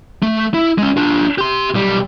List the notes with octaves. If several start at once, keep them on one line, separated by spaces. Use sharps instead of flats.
A3
E4
G#3 C#4
D4 F4
G4 C6
B1 G3